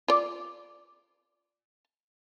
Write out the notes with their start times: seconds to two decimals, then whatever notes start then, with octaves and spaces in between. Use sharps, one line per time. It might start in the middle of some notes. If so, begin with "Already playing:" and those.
0.08 F4 D5